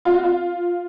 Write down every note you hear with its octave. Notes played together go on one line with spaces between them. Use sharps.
F4
F#4
F4